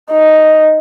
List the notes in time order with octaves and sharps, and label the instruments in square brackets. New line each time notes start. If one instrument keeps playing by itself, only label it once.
[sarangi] D#4